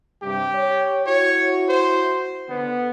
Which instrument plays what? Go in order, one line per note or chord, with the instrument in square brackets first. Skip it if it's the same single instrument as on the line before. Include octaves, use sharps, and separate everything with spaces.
[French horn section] G2 C3 G3 [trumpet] G4
[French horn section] C#5
[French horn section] E4 F#4 [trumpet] C#5
[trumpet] C5
[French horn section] D3 [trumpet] B3